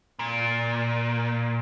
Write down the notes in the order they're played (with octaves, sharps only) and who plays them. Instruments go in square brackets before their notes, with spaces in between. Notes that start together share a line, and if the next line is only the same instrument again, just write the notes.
[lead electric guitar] A#2